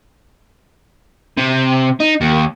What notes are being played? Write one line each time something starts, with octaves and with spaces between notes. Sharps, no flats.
C3
D#4
D#2